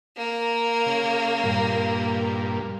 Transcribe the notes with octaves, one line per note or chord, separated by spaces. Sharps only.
A#3
C#3
G2 A#2